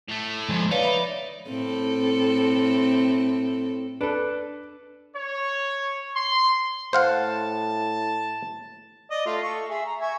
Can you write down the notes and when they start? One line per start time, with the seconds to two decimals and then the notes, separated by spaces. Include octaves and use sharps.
0.08 A2 A3
0.49 F3 G#3
0.71 D#4 B4 C#5 D5 F5
0.83 E5 B5
1.49 A2 C4 A4
4.01 D4 A4 B4
5.15 C#5
6.15 C6
6.93 A2 C5 F5 F#5 A5
9.11 D5 D#5
9.26 A3 F4
9.43 A4 C#6
9.69 G#4 E5
9.86 A#5
10.01 E5 G#5 C#6